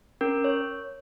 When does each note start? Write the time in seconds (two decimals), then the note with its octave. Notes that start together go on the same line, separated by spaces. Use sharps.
0.21 C#4 A#4
0.44 C#5